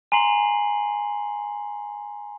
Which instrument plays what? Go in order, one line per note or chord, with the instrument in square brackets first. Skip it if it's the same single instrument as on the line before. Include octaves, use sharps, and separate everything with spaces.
[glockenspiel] G#5 A#5 C6 C7 F#7